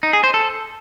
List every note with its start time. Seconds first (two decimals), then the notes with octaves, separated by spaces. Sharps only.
0.03 D#4
0.13 G#4
0.24 C5
0.34 A4